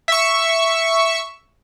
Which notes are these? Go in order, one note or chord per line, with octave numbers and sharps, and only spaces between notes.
E5 C#6